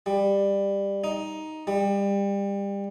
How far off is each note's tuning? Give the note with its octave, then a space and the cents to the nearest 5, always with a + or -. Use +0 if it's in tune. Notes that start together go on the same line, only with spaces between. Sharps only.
G3 +15
D#4 +5
G3 +25